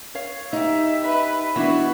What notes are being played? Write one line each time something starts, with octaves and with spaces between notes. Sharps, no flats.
C#5 F5
D#4 G4 E5
B4 E5
E3 B3 D4 E4 F#4 E5